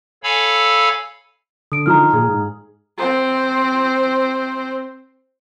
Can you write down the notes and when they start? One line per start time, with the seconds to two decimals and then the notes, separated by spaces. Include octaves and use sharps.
0.23 A4 C#5 F5 G#5 B5 E6
1.72 D3 D#6 D7
1.86 D#3 F3 A#5 D#6 F6
2.13 A#2 G#4
2.28 G#2
2.99 C4 C5